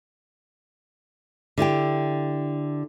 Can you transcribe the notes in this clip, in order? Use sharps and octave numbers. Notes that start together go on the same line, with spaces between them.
D3 E4 G4 G5